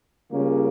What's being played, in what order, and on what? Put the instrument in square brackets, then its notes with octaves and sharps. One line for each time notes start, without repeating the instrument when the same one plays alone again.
[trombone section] C#2 C#3 G3 A#3 C#4